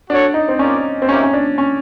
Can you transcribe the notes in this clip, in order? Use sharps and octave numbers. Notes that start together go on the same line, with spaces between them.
D4 F#4 A4 C#5 F#5
D#4
C4
C#4 F4 A#4 D5
C4
A#3 C#4 D#4 G4 C5 E5
C#4
D4
C#4